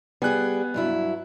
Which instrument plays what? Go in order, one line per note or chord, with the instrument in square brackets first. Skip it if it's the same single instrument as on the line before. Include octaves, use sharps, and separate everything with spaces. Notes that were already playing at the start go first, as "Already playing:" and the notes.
[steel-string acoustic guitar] G3 G#4 [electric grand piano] B3 G#5 F#6
[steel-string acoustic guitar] G2 F#3 E4